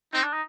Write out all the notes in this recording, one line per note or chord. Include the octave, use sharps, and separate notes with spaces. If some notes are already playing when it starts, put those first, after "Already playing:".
C4 D#4
D4
D#4